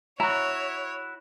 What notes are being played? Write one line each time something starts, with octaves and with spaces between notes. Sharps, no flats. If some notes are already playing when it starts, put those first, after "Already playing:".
E4 F#4 C#5 A#5